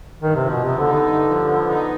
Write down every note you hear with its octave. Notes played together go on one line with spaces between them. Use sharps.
G2 D#3
C3
F3
B2
C3 B3
D3
D#4
D3
G2
F3
B3
D#4